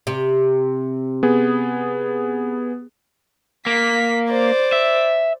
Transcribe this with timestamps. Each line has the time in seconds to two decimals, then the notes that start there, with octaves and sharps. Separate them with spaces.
0.07 C3
1.23 B3 G#4
3.66 A#3 B6
4.30 C5 D5
4.72 E5